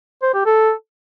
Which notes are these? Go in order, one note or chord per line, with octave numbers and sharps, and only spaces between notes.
C5
G4
A4